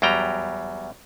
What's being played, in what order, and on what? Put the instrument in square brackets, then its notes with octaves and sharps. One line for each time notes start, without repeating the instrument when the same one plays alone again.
[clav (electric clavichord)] E2 F#3 G3 G5 A#5